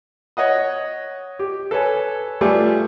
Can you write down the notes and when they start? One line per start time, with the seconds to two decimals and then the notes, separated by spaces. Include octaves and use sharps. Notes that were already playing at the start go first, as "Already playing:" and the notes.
0.37 C#5 D#5 F#5 D#6
1.39 G4
1.71 A4 B4 C#5 G#5
2.41 G3 A3 F4 G4 G#4 B4